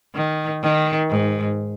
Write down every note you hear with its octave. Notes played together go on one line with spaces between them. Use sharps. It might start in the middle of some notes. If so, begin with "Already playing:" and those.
D#3
D#3
G#2